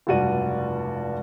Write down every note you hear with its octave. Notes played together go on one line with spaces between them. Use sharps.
F1 C#2 G2 F#4 D5 D#7